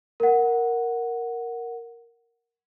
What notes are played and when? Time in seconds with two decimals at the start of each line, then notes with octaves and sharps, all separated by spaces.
0.20 A#4 F#5